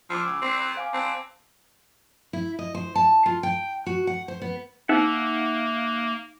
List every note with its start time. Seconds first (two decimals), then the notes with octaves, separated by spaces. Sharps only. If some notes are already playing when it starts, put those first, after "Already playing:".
0.10 F3 D6 E6
0.26 C#2
0.42 C4
0.77 F5 G#5 D6
0.93 C4 A5
2.33 E4
2.59 D#5
2.75 C5
2.95 A5
3.26 F4
3.43 G5
3.86 F#4
4.07 F#5
4.28 C5
4.42 B3
4.89 A#3 D#4 E5 F#5